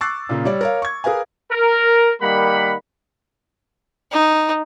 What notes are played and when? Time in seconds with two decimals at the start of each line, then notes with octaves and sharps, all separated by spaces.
0.01 C#6 D6 E6 F#6 A6 C7
0.29 A#2 C#3 A#3
0.45 G3 C#5 D5
0.61 A#4 C#5 F5
0.82 C#6 G#6
1.04 G#4 A#4 B4 F5 G#5
1.51 A#4
2.22 D#3 G3 A#3 F#5 B5
4.12 D#4